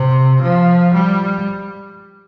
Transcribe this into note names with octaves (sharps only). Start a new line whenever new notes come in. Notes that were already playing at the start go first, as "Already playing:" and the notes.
Already playing: C3
F3
G3